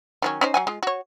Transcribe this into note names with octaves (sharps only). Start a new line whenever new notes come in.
D#3 F#3 C#4
C#4 D#4 C5
F#3 F#5 G#5
G#3 F4
F#4 C#5